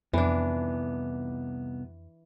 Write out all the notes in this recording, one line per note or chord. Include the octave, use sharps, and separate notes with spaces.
C2 F2 E3 B3 D4